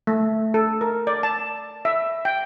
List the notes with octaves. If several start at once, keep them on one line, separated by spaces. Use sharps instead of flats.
A3
A4
A#4
D5
A5
E5
G5